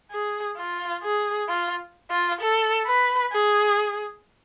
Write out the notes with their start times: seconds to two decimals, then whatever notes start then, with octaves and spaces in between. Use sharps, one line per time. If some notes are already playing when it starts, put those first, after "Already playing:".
0.11 G#4
0.57 F4
1.03 G#4
1.49 F4
2.10 F4
2.41 A4
2.86 B4
3.32 G#4